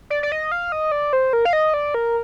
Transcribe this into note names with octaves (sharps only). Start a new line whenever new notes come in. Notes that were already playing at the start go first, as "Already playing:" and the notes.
D5
D5
D#5
F5
D#5
D5
C5
A#4
F5
D#5
D5
A#4